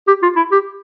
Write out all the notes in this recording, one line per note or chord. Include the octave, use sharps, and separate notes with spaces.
G4
F4
E4
G4